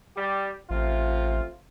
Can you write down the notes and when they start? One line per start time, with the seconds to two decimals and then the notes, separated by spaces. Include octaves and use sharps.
0.17 G3 G4
0.70 A1 C3 A3 F4